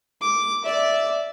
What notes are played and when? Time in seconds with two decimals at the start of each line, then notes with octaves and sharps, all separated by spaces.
0.21 D6
0.64 D5 E5